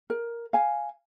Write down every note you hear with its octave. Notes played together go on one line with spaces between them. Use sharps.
A#4
F5 G#5